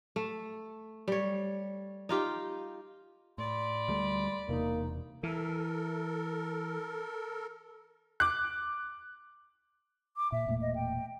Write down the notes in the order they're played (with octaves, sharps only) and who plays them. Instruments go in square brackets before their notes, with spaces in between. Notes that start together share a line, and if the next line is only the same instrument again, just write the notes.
[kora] A3
G3 C#5
D#4 F4 G4
[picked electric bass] A2 [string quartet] D5 B5 [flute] C6
[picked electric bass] D2 G3 A3
[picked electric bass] E1 E2 C3 [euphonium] A#3 [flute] D#4
[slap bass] E3 [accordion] A4 A#4
[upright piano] D6 F#6
[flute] D6
[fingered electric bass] A#2 [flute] E5
[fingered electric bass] E1 A#2 A3
[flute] D#5
G5